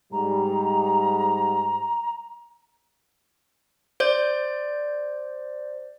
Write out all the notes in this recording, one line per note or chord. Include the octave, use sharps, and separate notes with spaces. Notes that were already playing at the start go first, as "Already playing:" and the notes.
G#2 G3 A#5
C5 D5 G6